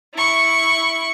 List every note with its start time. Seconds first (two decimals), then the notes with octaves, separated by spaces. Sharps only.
0.14 E4 C#6